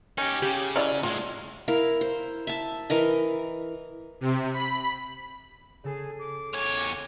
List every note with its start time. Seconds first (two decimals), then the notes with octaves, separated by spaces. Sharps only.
0.18 C#4 D#4 G4
0.42 C#3 G4
0.76 F#3 E4 D5 D#5 F6
1.03 A2 G#3 F4
1.68 E4 A#4 F5
2.01 C5
2.47 E5 A5
2.90 E3 A#4 D#5
4.21 C3
4.53 B5
5.84 C#3 G#4 A4
6.19 D6
6.54 E2 C#5